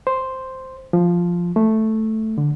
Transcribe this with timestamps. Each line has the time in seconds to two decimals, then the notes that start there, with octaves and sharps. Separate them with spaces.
0.07 C5
0.93 F3
1.56 A3
2.38 D3